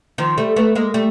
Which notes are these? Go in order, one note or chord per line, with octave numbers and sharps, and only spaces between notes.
D#3 F3
G3 A3
A3 B3
G#3 A#3
G3 A3